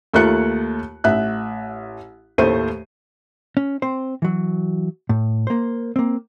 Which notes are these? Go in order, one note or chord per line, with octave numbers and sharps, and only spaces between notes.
D#2 A3 A#3 F4 F#6 C#7
A1 E5 F#6
D#2 A2 A3 C5 D#7
C#4
C4 C5
E3 F#3
A2
A#3 C5
A#3 C4